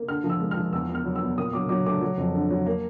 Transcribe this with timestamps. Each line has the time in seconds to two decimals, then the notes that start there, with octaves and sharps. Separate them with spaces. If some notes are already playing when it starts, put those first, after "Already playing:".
Already playing: A#3
0.08 D3 F6
0.24 F3
0.30 E6
0.41 G#3
0.51 F6
0.57 F3
0.73 E2 E6
0.89 B3
0.95 F6
1.05 F#3
1.16 E6
1.21 B3
1.38 A#2 D#6
1.53 F#3 D6
1.69 F#3 D6
1.86 A3 D6
2.01 F#3
2.17 F2
2.34 D3
2.51 F#3
2.66 A#3